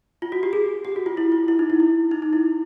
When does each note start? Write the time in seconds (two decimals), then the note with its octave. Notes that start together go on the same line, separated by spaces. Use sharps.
0.22 F4
0.32 F#4
0.43 G4
0.53 G#4
0.85 G4
0.96 F#4
1.06 F4
1.17 E4
1.32 F4
1.48 E4
1.59 D#4
1.70 E4
1.80 E4
2.11 D#4
2.22 D#4
2.33 E4